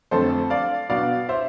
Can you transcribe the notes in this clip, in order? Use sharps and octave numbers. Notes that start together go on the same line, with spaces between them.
F2 D3 F3 A3 C4 A4 C5
D5 F5
B2 B3 D4 D5 F5
C5 E5